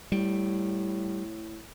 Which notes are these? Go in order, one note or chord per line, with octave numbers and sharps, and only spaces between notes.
A2 G3